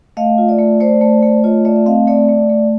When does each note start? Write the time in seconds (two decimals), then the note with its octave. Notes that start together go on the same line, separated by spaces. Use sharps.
0.17 A3 D#5 F5
0.38 F4
0.48 D5 E5
0.59 A3
0.81 A3 C5 D5
1.01 A3
1.23 A3
1.44 F4 C#5 D#5
1.65 A3 D5 E5
1.76 E5
1.86 C4 D#5 F5
2.07 A3 D5 E5
2.29 A3
2.49 A3